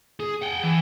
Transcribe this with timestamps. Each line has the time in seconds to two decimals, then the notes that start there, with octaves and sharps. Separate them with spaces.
0.20 G#4
0.42 F#5 G5
0.63 E3